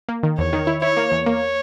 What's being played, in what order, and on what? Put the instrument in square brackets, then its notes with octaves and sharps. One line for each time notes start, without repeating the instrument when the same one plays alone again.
[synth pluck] A#3
D#3
[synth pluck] E2 [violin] C#5
[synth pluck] D#3
E4
[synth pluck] E4 [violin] C#5
[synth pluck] A#3
E2
[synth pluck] A#3 [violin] C#5